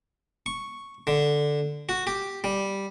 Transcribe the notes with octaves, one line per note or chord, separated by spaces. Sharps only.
C#6
D3
F#4
G4
G3